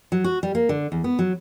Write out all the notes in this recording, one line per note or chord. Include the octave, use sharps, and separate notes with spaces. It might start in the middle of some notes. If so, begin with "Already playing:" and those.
F#3
F#4
G3
A#3
D3
E2
B3
F#3